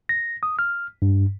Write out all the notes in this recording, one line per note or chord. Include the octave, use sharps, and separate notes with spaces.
A#6
D#6
F6
G2